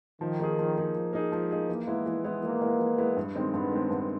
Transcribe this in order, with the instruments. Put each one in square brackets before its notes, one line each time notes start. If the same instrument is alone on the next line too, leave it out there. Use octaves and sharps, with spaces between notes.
[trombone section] D#3 [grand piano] F3
[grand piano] A#3 D#4 G#4
F3
A#3 D#4 G#4
F3
A#3 D#4 G#4
[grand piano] F3 [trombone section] G#3
[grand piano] A#3 D#4 G#4
[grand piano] E3 [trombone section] A#3
[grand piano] G#3 B3 E4
E3
G#3 B3 E4
[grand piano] E3 [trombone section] A#3
[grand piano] G#3 B3 E4
E3
G#3 B3 E4
G2
D#3 G#3 C4
[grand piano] G2 [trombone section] B3
[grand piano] D#3 G#3 C4
G2